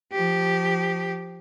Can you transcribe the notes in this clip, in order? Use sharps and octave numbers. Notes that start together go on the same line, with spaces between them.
F3 G4